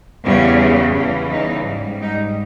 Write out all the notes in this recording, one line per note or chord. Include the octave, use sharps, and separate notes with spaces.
E2 C#3 E3 G3 C#4
E2 C#3 E3 C#4
D#4
G#2 G3
D#4